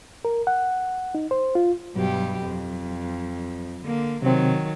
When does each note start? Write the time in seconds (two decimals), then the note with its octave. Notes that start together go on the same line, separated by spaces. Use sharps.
0.25 A#4
0.47 F#5
1.15 D#4
1.31 C5
1.55 F4
1.96 G2 B2 F#3 G4
2.43 F2
3.83 D3 A#3
4.22 C3 D#3 F#3 C4